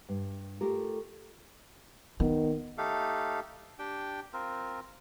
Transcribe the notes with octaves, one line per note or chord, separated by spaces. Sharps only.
G2
A3 F4 G4 A4 A#4
D#3 B3
A3 D#4 G4 A4 F5
D4 G4 G5
C4 F4 A#4